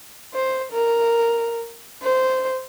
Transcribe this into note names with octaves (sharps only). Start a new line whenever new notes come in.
C5
A#4
C5